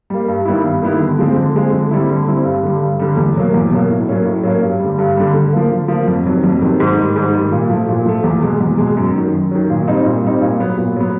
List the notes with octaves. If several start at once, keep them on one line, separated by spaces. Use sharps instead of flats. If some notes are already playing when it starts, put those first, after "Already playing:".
G3 A#3
G2
D#3 G3 B3 E4
G2
D#3 G3 B3 E4
D3
F3 G#3 C4
D3
F3 G#3 C4
D3
G3 C4 E4
D3
G3 C4 E4
G2
D3 G3
G2
D3 G3
E2
B2 F#3 A#3
E2
B2 F#3 A#3
A2
F#3 A#3 C#4
A2
F#3 A#3 C#4
G2
D3 G3
G2
D3 G3
D3
F3 A#3
D3
F3 A#3
F2
C3 D#3 F#3
F2
C3 D#3 F#3
G#2
D#3 G3
G#2
D#3 G3
A#2
F3 A3
A#2
F3 A3
E2
B2 G#3
E2
B2 G#3
F#2
D#3 F#3
F#2
D#3 F#3
A#2
G3 C4 D#4
A#2
G3 C4 D#4
A#2
F#3 B3
A#2
F#3 B3